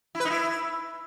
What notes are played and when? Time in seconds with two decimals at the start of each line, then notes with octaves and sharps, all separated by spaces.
0.15 E4
0.20 B4
0.25 D#4
0.30 E4